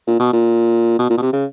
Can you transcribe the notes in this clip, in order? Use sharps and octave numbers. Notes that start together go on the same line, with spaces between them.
A#2
B2
A#2
B2
A#2
B2
C3
C#3